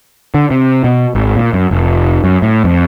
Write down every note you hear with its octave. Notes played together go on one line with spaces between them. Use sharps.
D3
C3
B2
G#1
A#2
F#2
F1
F#2
A2
F2